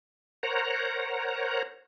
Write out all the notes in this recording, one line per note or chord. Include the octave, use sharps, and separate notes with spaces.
A#4 C5 C#5 F#5 A#5